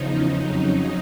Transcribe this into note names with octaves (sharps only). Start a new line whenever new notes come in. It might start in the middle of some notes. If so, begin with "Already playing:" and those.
Already playing: E2 C#3 F3 D#4
F2 C#3 F#3